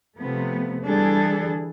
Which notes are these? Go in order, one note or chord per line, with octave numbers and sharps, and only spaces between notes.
C3 F3 A3 B3
D3 E3 G3 D4 G#4 A4